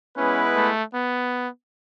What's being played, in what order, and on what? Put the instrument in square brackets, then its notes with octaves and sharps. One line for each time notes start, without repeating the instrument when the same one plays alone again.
[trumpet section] G#3 B3 E4 B4 [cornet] C#4
[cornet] A3
B3